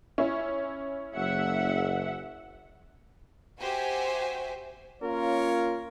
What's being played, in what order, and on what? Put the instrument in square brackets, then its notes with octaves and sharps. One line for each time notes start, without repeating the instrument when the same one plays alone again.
[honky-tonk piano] C#4 E4
[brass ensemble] F#1 [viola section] E5 F#5
[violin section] F#4 G4 C5 E5 G#5
[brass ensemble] A#3 C#4 F4 A#4 C#5